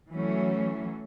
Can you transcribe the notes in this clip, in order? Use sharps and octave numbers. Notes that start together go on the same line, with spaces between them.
E3 F#3 A3 C#4